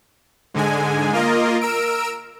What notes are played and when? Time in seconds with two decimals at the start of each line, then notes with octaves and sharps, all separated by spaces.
0.54 G#2 D3 G#3 G#5
1.13 A#3 F4 A#4 D#5
1.61 A#4 E6 D7